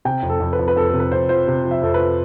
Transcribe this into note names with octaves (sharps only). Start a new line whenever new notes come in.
C3 G5
F2
A4
F2
B4
F2
B4
F2 A4
A4
C3
B4
F2 C5
F3 C5
C3
F3
E5
F2 A4
B4
F3